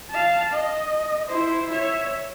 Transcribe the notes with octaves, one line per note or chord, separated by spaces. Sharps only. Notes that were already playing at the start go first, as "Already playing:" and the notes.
F5 A5
D#5
E4 C5
C#5 E5